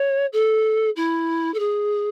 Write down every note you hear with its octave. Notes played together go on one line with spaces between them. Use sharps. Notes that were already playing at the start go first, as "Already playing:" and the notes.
Already playing: C#5
A4
E4
A4
G#4